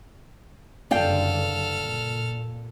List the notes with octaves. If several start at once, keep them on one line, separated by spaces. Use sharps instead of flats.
F#1 G2 D3 A4 D5 F5 G5 F6
A#2